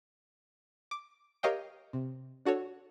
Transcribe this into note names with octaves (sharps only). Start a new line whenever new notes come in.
D6
G4 A#4 C#5 D#5 F5 G5
C3
D4 F#4 A4 C#5